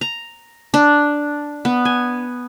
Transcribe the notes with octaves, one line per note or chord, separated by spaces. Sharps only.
A#5
D4
B3
G#5